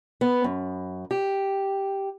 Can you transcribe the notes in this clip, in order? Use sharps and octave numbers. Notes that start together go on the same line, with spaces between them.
B3
F#2
G4